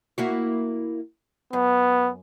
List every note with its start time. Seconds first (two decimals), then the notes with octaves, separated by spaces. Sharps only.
0.18 A#3 E4 F#4
1.53 F#2 B3